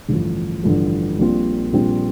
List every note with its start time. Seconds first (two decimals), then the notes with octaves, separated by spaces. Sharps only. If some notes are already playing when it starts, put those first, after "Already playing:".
0.09 A1 G2 D3 F3
0.64 A1 G2 D3 F3
1.19 A#1 A#2 G3 C4 F4
1.73 A#1 A#2 G3 C4 F4